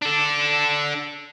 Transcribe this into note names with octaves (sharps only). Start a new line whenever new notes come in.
D4 A4